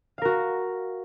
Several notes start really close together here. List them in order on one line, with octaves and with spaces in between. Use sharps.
F5 A#4 F#4